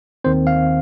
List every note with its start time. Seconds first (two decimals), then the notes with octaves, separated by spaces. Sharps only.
0.24 D#2 D#3 C4 C5
0.47 F5